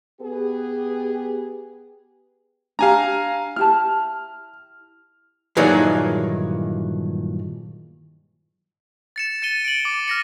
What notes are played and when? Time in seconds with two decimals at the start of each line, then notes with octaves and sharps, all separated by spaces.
0.21 B3 G4 G#4
2.79 D4 G4 F5 G#5 A#5
3.56 E4 G4 A5 F6
5.57 G2 A#2 D#3 E3 F#3 G#3
9.16 A6 C#7 E7
9.42 A6 C#7 D#7 G7
9.65 D7 F#7
9.85 D6
10.08 F6 A#6 C#7